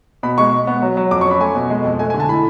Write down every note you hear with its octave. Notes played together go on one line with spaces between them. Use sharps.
B2 B5
G#3 C#6
G#3
B3
F#3
F#3
F2 D6
C#6
C#4
B5
A3 G#5
B2
G#3
F2
A3 G#5
G#5
D3
A5
A2 B5